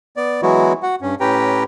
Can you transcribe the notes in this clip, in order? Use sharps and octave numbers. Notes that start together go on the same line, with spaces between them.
B3 D5
E3 F#3 G#3 B3 E4 F#4
F#4 F#5
G2 C#4
A2 C#4 G4 B4 G5 A#5